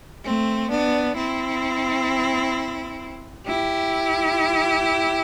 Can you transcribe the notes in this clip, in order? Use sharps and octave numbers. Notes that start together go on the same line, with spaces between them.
A3 C4
B3 D4
C4 E4
E4 G4